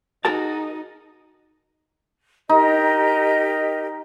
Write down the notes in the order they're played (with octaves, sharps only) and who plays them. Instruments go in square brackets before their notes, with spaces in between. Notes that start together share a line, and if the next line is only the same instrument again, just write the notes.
[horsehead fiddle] D#4 D#5 [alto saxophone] F#4 [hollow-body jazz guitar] G#4 A#4 A5
[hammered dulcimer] D#4 [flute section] G4 A#4 D#5